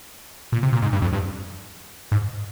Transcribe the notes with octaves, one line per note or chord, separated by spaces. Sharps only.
A#2
C3
A#2
G#2
G2
F2
G2
G#2